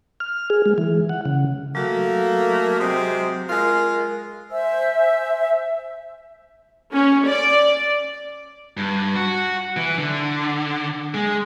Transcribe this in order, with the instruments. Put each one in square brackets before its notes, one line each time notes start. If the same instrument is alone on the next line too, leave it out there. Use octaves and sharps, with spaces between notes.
[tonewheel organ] F6
G#4
G#3
E3
F#5
C#3
[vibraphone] F#3 F#4 [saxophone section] A3 A#3
[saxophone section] C3 G#3 C4
[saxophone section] G#3 F4 [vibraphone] A#4
[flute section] C5 E5 G#5 E6
[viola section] C#4
D5
[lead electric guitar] G2
F#4
E3
D3
G#3